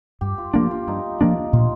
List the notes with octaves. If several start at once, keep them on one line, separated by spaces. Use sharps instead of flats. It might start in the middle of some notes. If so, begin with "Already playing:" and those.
G2 G4
F4
F3 A#3 D4 G4
F4
G2 D#4
F3 A#3 D4
A#2 F4